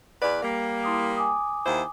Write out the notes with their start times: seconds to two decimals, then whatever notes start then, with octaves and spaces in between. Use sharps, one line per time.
0.21 E2 B4 D5
0.42 G3 A#3
0.84 E4 C6 D#6
1.17 G#5 D6 D#6
1.64 D#2 E4 C5